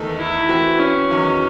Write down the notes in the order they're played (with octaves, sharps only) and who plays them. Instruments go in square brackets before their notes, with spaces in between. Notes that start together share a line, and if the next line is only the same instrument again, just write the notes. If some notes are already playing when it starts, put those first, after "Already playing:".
Already playing: [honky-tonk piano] E2 D#3 A3 D#4 A4
[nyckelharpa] E4
[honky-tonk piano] E3 C4 F#4
[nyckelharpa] C#4
[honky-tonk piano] E2 D#3 F#3